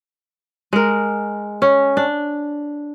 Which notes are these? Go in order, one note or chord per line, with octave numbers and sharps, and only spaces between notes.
G#3 A#4
C#4
D4